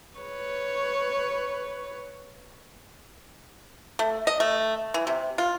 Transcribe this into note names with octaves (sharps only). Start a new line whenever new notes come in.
B4 C#5
A3
D#5
A3
E3
C3
F4